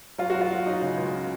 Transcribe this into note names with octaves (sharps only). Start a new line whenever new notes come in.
F#3 F4
F#3 F#4
F4
F#3
F#3 D#4
C#3
C#2